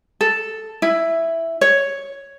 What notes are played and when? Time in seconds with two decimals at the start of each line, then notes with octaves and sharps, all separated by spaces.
0.21 A4
0.82 E4
1.61 C#5